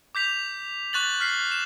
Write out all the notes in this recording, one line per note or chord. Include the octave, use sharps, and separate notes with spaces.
D6 G6 B6 F7
C#6 F#6 A6 F#7
F6 B6 C7
E7